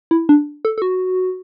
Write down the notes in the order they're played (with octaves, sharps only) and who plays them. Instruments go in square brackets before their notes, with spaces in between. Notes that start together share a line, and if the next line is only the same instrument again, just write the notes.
[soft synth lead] E4
D4
A4
A4
F#4